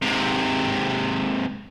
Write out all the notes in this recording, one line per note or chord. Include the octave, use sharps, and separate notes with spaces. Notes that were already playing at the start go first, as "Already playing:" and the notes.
G#2 C3